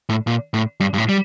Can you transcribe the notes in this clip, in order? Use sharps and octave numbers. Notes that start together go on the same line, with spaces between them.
A2
A#2
A2
G2
G2
A2
G3